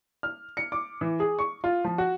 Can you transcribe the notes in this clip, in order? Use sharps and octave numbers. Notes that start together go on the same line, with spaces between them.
F6
C#7
D6
E3
G#4
C#6
F4
F3
F#4